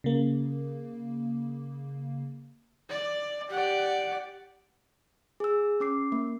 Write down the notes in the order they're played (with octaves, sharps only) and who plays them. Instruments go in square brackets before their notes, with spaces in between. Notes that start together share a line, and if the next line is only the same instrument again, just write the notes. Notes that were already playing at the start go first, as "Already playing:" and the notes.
[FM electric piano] C#3 A#3
[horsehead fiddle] D5
[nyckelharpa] G4 D5 [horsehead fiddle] F#5
[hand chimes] G#4 E6
C#4 D6 C7
A#3